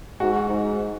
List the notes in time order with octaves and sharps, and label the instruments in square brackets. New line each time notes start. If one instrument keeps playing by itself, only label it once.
[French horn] G#2 [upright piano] F#4
[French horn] G#2